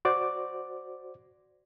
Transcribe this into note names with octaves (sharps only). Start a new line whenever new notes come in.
F#4 C5 D5 D6